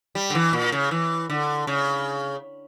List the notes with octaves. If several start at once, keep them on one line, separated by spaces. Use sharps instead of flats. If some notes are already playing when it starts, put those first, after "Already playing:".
G3
D3
E3
A#2
C#3
E3
D3
C#3